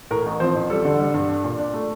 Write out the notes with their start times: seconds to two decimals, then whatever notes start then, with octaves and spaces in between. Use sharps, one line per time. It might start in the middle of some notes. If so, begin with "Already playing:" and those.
0.11 A2 A#4
0.26 A1
0.40 F3 C4 C5
0.55 A1
0.70 G3 A4
0.85 D3
0.99 G3
1.14 G2
1.29 D4
1.44 A#2
1.59 D4
1.73 A3